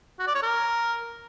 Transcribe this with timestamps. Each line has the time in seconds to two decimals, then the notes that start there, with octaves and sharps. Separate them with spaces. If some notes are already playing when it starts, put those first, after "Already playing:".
0.19 F#4
0.27 D5
0.35 C#5
0.43 A#4